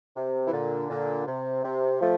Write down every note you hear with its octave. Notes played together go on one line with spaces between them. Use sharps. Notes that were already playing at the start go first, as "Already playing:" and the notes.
C3
E3
A#2 D3
A#2 D3
C3
C3
F3 A3